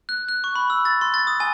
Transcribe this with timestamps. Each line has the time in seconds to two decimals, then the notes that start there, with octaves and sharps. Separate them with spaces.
0.09 F#6
0.29 F#6
0.44 C#6
0.56 B5
0.70 E6
0.85 A6
1.01 C6
1.14 A6
1.27 D#6
1.40 G#5